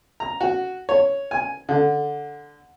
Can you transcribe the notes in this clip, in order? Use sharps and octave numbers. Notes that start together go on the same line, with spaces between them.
A#5
F#4
C#5
G#5
D3